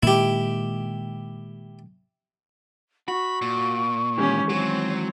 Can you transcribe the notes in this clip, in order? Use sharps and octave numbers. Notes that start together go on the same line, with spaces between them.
A#2 D#3 G#3 E4 G4
F#4 B5 C#6
A#2
D#3 E3 G#3 C#4 G4
F#3 C4 C#5